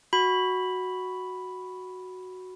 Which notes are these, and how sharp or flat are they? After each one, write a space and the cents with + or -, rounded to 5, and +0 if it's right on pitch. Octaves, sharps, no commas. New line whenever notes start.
F#4 +0 B5 +0